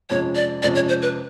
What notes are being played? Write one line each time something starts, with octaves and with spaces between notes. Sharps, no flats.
F2 C3 F3 G#3 C#4 C#5
D5
F2 C3 F3 G#3 C#4 D5
C#5
C5
B4